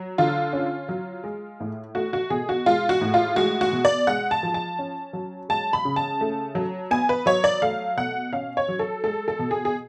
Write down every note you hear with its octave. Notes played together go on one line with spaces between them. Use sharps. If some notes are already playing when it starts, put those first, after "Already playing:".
Already playing: F#3
D3 F4
C#4
F#3
G#3
A2
A3 F#4
F#4
B2 G#4
F#4
G#3 F4
F#4
A2
F4
G#3 F#4
F#4
B2
D5
G#3 F#5
A5
F3
A5
C#4
F#3
G#3 A5
B5
C#3
A5
A3
F#3
B3 G#5
B4
F#3 C#5
D5
A3 F5
B2 F#5
C#4 F5
C#5
F#3
A4
G#3 A4
A4
B2
G#4
G#4